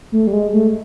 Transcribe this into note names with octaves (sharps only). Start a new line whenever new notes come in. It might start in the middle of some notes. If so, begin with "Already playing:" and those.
A3
G3
G#3
A3